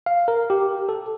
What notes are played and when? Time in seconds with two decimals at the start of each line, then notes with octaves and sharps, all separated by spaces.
0.06 F5
0.28 A#4
0.50 G4
0.89 A4